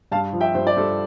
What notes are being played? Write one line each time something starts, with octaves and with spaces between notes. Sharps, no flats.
G2 F5 A5
F3
E5 G5
G2 C5
D5
G2 A4 C5